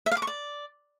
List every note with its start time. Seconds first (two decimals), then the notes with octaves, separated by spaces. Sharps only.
0.06 E5
0.12 F5
0.17 D6
0.22 C#6
0.27 D5